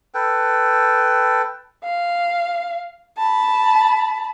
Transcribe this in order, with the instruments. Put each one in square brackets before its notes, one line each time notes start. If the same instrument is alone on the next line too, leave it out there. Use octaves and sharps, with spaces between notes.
[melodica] A4 B4 G5
[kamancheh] F5
A5 B5